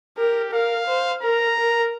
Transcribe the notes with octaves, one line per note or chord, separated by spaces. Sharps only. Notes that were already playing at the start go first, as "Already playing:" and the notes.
G4 A#4
A#4 F5
C5
A#4 A#5
A#4